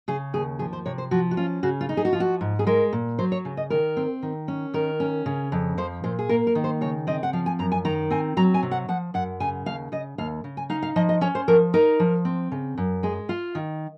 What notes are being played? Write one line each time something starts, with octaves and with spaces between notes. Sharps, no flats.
C#3 G#4
D#2 G#4
F3 G#4
C5
C3 C#5
C5
F3 F#4
F#4
C#4 F4
C#3 F#4
F4
D#4
G#4
F#4
F3 F4
F#4
G#2
G#4
G#3 A#4
A#2
F#3 C5
C#5
C#3
D#5
D#3 A#4
C4
D#3
C#4
D#3 A#4
C#4
C#3
F2
F3 C5
A#2 C5
G#4
A#3 A#4
A#4
D#3
C5
C#3 C#5
C4 D#5
F#5
F3 F5
G#5
F#2 A#5
G#5
D#3 A#5
C4 G#5
F#3 A#5
G#5
C3
F#5
F3 F#5
F#2 F#5
C#3 G#5
D#2 F5
C#3 D#5
D#2 F5
C#3
G#5
D#4 F5
F5
F3 D#5
D#5
C#4 C#5
C5
F3 A#4
D#4 A#4
F3
C4
C#3
F#2
G#3 G#4
F4 F5
D#3